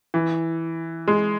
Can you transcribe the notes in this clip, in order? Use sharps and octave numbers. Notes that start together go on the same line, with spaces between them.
E3
G#3